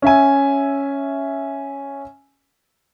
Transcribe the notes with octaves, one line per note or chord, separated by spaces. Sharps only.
C#4 E5 G#5